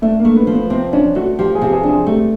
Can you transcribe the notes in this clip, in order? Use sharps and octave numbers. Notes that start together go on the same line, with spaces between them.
A3 D4
A#3
A3
B3
F3
B3
C3 C4
C#4 D4
A3 F#4
F3 G4
G#4
C3 G4
G#4
D4
G#4
A3 G4